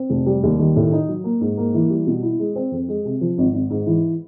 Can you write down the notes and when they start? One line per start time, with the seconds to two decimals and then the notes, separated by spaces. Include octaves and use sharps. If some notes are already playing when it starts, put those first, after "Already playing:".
Already playing: C4
0.10 F1
0.26 G3
0.43 D#2
0.59 D#3
0.76 A2
0.92 D#4
1.08 F#3
1.24 A#3
1.41 G#2
1.57 A#3
1.74 E3
1.90 G3
2.07 B2
2.23 E4
2.39 G#3
2.56 C4
2.71 F2
2.88 G#3
3.05 C3
3.21 F3
3.38 G#1
3.54 G#1
3.70 G#2
3.87 E3